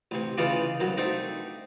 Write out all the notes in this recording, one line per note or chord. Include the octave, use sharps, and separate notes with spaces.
A1 C3
C#3 E3 D#4 F4 D5 D6
C2 F#2 F#3
A3 C4 D4 D#4